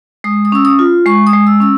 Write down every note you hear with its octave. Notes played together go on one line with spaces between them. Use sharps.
G#3 D#6
D#6
C#4 E6
D#6
F4
G#3 C#6
D#6
G#3
E6
C#4 E6